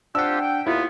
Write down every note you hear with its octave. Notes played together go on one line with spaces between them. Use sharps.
C4 D4 F4 G4 F#5 E6
G5
D#2 B3 E4 F4